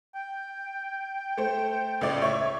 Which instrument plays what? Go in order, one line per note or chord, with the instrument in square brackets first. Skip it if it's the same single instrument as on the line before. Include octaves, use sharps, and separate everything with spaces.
[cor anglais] G5
[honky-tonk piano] A3 C5
C#2 A2 D5
C#5 E5 C#6